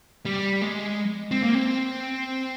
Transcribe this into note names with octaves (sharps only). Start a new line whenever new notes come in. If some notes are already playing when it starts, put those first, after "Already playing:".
G3
G#3
C4
A#3
C4